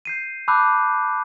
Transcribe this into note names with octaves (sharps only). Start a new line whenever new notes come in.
G6 C7 D#7
A5 B5 D6 E6 F#6 G6